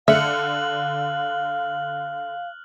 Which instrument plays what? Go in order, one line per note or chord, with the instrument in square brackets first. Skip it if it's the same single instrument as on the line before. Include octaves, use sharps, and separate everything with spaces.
[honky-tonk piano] D3 C#7 [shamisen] E5 [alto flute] F5 [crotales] F6 F#6 F#7